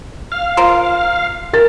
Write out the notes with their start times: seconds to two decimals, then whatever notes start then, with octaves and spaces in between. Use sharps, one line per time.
0.32 F5
0.57 F4 A#4 C5
1.53 A#4 A6